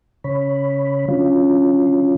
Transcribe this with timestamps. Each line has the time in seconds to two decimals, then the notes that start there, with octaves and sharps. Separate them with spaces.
0.24 C#3 C#5 B5
1.08 D3 F#3 C#4 F4